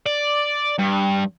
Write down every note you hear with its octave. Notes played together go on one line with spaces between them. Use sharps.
D5
G2